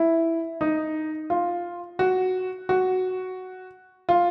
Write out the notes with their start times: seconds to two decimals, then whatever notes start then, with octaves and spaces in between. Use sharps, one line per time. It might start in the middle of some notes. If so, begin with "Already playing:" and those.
Already playing: E4
0.61 D#4
1.30 F4
1.99 F#4
2.69 F#4
4.09 F4